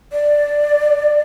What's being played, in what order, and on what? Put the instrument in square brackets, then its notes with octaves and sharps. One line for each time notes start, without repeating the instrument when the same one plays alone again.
[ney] D5